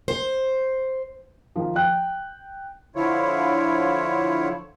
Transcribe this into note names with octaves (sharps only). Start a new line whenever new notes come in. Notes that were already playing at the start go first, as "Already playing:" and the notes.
C5
D#3 F3
G5 F#6
D3 F3 E4 F4 C#5